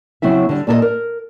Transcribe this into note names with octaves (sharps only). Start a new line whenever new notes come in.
C#3 F#3 C4 E4 E5
D3 G3
A#2 A4 A#4 D#5
A#4